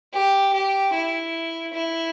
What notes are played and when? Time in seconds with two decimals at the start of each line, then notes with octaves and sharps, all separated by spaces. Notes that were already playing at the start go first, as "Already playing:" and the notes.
0.14 G4
0.53 G4
0.94 E4
1.74 E4